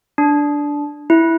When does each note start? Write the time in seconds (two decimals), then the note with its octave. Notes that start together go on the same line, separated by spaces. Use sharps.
0.18 D4
1.10 E4